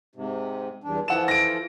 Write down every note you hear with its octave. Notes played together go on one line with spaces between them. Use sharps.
G#2 C3
E2 G2 D4
E3 F3 A4 F#5 E7
A#6 D7